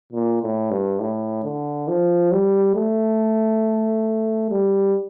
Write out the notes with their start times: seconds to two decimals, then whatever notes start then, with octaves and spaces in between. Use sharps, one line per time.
0.13 A#2
0.43 A2
0.71 G2
1.00 A2
1.44 D3
1.88 F3
2.32 G3
2.75 A3
4.50 G3